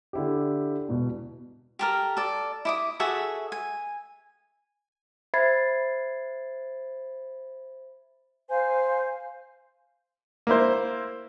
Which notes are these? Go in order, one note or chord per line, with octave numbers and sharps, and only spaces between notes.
D3 E4 G4
E1 B2
G4 A4 A#4
A4 D5
E4 D6 D#6
F#4 G#4 A4 E5
G#5
C5 E5 B5 G#6 A6 C7
C5 F5 G#5
A#3 E4 C5